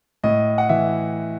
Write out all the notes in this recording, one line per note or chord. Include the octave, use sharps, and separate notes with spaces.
A2 D#5
F#5
E3 E5